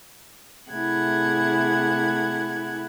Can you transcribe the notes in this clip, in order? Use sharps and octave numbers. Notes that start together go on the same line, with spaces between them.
C3 A3 E4 G#4 F#5 G#6